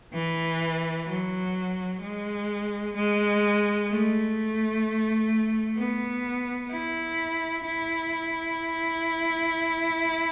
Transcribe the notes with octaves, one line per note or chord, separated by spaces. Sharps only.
E3
F#3
G#3
G#3
A3
B3
E4
E4